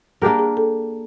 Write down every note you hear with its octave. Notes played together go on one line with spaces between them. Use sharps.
A#3 D4 G4 G#4 A#4
G#4
A4